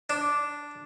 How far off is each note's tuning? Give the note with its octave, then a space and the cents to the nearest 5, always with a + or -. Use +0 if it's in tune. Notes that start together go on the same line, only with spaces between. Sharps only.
D4 -5